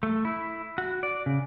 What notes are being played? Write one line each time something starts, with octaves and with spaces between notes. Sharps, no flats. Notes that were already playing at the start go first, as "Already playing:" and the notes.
A3
E4
F#4
D5
C#3